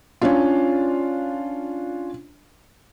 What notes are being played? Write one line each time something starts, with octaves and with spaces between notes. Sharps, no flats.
C#4 D4 F4